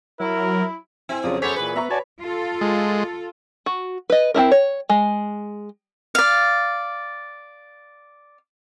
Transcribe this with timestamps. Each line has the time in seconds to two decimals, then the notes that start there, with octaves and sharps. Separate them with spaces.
0.20 F#3 E4 A#4
1.09 C4 E4 G#5
1.24 F2 C#3 F#3 C#4 F4 D5 D#6
1.42 F#2 B3 G#4 A4 C5 C#5 D6 B6
1.56 A#2 E3 B4
1.76 B3 E5 A#5 C#6
1.90 F#4 C#5 D5 G#5 A5
2.22 F4 A4
2.61 G#3
3.66 F#4
4.10 B4 D#5
4.34 C4 D#4 E4 A#4
4.52 C#5
4.90 G#3
6.15 D5 F5